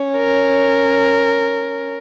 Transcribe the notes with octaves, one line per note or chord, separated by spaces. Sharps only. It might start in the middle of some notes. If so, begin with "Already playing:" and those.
Already playing: C#4
A#4